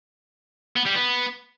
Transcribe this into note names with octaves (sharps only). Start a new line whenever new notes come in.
B3
G3
B3